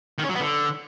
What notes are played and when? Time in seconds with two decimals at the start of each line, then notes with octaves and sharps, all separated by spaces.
0.18 D#3
0.24 C#4
0.29 F#3
0.35 B3
0.40 D3